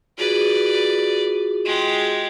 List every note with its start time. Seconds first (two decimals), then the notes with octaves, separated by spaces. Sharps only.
0.18 F4 F#4 G#4 B4 D5
1.65 G#3 G4